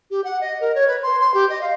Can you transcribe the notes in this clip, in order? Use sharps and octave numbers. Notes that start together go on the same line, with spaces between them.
G4
F#5
D#5
A#4
C#5
B4
C6
C6
G4
D#5
F5